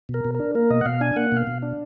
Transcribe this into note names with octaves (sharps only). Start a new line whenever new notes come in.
B2
A#4
B2
A#4
D4
A#3 A#4
B2 D#5
F#5
B2 F5
D4 G#5
A#3 F#5
B2 F5
B2
D4